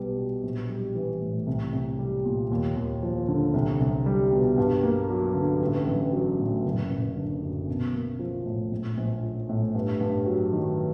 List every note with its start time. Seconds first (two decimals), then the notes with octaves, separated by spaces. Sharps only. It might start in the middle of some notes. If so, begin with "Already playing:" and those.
Already playing: B1 G3 B3
0.18 B2
0.43 A#1
0.70 G3
0.95 E3
1.22 A2
1.47 C2
1.73 C2
1.99 G3
2.25 A#2
2.51 D#2
2.76 D#2
3.03 F3
3.28 D3
3.54 C2
3.80 C2
4.06 G3
4.32 B2
4.58 G2
4.83 A#3
5.10 F#3
5.35 D3
5.61 A1
5.87 A1
6.13 F#3
6.39 A2
6.64 F#1
6.91 F#1
7.16 D3
7.42 F#2
7.68 B1
7.93 A#3
8.19 F3
8.46 A2
8.71 A#1
8.97 A#1
9.23 F3
9.49 A2
9.75 G2
10.01 G2
10.26 F#3
10.53 D#3